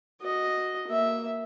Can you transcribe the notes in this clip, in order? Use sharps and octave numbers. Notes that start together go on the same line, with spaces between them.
F#4 D#5
A#3 E5